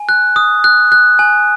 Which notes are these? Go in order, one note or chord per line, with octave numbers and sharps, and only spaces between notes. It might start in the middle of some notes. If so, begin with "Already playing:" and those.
Already playing: G#5
F#6
D#6
F#6
F#6
G#5